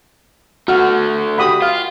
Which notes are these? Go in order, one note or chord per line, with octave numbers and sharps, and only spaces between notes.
D3 A3 F#4 F6
F#4 G4 B5 D#6
F4 F5